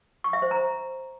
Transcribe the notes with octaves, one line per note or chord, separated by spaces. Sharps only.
C#6
E5
C5
A#5